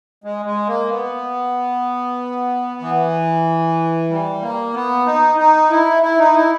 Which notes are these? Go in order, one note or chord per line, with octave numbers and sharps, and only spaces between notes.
G#3
G#3
A#3
B3
E3
G3
A#3
B3
D#4
D#4
E4
E4
D#4
E4